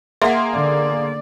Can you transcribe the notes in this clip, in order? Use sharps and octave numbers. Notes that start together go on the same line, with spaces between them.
A#3 G#4 E5 F#5 C6
D3 D5